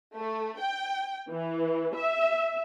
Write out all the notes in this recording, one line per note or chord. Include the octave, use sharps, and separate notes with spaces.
A3
G5
E3
E5